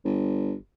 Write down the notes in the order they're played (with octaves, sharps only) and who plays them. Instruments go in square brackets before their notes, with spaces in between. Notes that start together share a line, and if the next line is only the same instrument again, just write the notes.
[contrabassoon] G1